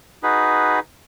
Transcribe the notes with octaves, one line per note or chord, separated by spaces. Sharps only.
D#4 F#4 G#4 B4